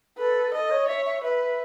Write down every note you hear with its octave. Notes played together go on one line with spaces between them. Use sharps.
A4 B4
A4 D#5
C#5
C#5 E5
E5
B4 E5